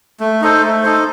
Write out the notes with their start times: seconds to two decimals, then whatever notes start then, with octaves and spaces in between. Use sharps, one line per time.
0.20 A3
0.42 D#4 A4 C5
0.63 A3
0.83 D#4 A4 C5